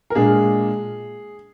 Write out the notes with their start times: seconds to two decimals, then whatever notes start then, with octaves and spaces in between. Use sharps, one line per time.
0.10 A#4
0.15 A#2 G#3 D4 G#4